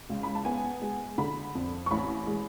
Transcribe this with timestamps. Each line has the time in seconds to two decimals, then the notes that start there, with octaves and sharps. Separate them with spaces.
0.10 C#2
0.23 B5
0.35 A5
0.45 B3 G#5
0.82 G#3
1.18 D3 B5
1.55 F2
1.86 C#6
1.91 A1 B5
2.27 G#3